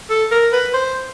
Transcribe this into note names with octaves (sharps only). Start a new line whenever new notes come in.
A4
A#4
B4
C5